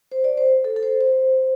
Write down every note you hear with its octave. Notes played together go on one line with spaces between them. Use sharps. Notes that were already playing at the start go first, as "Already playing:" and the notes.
C5
D5
C5
A4
A4
C5
C5